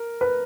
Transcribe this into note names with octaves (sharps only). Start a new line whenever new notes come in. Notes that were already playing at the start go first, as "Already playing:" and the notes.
Already playing: A#4
B4